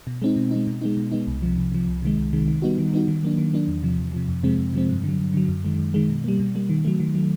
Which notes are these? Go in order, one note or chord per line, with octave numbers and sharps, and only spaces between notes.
B2
G#3 C4 D#4
B2
G#3 C4 D#4
B2
G#3 B3 D#4
B2
G#3 B3 D#4
C2
C3 F3
C2
C3 F3
C2
C3 D#3 G#3
C2
C3 D#3 G#3
D#3
G3 B3 D#4 F#4
D#3
G3 B3 D#4 F#4
D#3
F#3 A#3 D4
D#3
F#3 A#3 D4
E2
C3 F3
E2
C3 F3
F2
C3 F3 G#3 C4
F2
C3 F3 G#3 C4
G2
D3 F#3
G2
D3 F#3
F#2
D#3 G#3
F#2
D#3 G#3
B2
G3 A#3
B2
G3 A#3
D#3
F#3 A3
D#3
F#3 A3